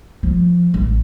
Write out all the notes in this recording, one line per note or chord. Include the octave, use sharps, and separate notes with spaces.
F3
A1